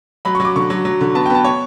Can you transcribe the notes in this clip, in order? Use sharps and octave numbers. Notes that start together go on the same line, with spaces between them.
F#3 B5
C#6
F#3
D6
D3 C#6
F#3
F#3
D3
B3 A5
G5
B3 A5
C#5